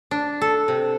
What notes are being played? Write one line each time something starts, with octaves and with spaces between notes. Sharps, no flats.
D4
A4
C3